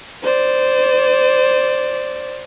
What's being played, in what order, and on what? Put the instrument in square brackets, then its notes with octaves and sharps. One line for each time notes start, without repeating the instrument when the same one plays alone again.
[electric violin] C5 D5